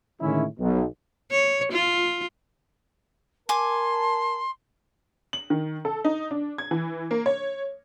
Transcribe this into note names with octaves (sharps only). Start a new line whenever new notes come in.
A2 D3 D#3 G#3 C#4 E4
B1
C#5
F4
A#4 G#5 A5 C6 D6
F#7
D#3
A4
D#4
D4
G#6
E3
A#3
C#5